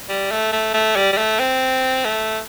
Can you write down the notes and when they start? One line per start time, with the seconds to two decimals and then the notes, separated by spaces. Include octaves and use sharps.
0.09 G3
0.32 A3
0.53 A3
0.74 A3
0.96 G3
1.13 G3
1.18 A3
1.39 C4
2.05 A3